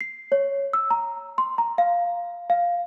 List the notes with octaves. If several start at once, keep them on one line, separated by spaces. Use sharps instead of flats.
C7
C#5
E6
A#5
C6
A#5
F5
F5